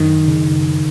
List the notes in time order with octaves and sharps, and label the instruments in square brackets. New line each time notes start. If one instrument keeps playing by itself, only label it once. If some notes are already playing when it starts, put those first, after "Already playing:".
Already playing: [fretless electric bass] F#2 D#3
C#3